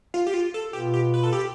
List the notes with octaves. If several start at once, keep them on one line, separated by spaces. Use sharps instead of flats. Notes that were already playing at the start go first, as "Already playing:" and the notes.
F4
G4
F4
A4
B2 B3 F4 G4
G4
B4
A4
G4